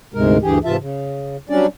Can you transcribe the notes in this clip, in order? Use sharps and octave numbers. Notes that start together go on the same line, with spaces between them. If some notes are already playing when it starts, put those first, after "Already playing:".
D2 G#2 C3 G#3 A#4
D2 G2 E3 G4 G#4
G#2 C3 E3 F4 E5 A5
C#3
F#3 G3 C#4 D4 D5